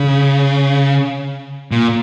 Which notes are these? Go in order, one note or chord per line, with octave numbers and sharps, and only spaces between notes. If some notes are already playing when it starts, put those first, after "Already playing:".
Already playing: C#3
A#2